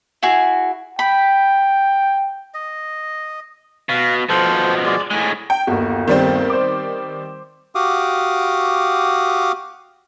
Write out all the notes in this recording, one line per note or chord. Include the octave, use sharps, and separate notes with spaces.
E4 F#4 G#4
G5 B5
D#5
B2 F5
B2 F3 A4 C5
G#3 D5
A2 G#3 G#5
G5
G1 D#2 F#4
D#3 G3 C4
C5 D6
F#4 G4 F5 D6 D#6